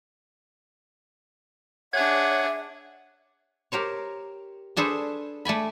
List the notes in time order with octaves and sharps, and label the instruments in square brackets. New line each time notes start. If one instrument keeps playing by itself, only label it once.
[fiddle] D4 G#4 [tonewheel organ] C#5 G#6 [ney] E5 [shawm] F#5
[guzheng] G4 A#4 C5 C#5
D4 G#4 A4 B4 C5
A3 D5 G#5 B5